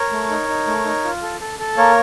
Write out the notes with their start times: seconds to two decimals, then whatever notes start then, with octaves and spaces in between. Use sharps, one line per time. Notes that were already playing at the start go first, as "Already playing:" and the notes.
Already playing: A#4 C#5
0.12 A3
0.30 D#4
0.49 D#4
0.67 A3
0.85 D#4
1.04 F4
1.22 A4
1.41 A4
1.59 A4
1.77 A#3 A#4 C#5